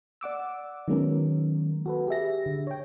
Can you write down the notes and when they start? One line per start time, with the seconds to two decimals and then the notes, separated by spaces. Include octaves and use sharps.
0.21 D5 F#5 D6 E6
0.88 D#3 F#3 G#3 B3 C#4 A#4
1.86 F#4 A4 B4
2.07 G4 G#4 E5 A#6
2.46 D3
2.67 C#5 G5